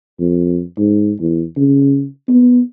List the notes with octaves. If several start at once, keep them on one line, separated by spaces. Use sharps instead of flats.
F2
G#2
E2
C#3
B3